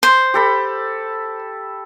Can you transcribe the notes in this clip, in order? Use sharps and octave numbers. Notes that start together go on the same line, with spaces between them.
C5
G4 A4 B5